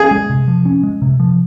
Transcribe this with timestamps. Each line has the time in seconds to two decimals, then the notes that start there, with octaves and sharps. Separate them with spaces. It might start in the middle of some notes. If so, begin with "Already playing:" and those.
Already playing: C#4 G#4
0.11 G#3
0.30 C3
0.48 F3
0.65 C#4
0.83 G#3
1.02 C3
1.20 F3